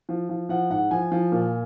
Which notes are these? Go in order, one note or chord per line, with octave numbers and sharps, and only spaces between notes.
F3
F3
F3 F#5
G#2 F#5
F3 G#5
F3
A#2